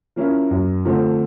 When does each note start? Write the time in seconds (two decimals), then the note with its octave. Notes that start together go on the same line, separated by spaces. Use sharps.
0.16 F3 A#3 C#4 E4
0.51 F#2
0.85 D3 F3 A3 C4